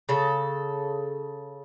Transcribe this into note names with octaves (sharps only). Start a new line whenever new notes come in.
C#3 A4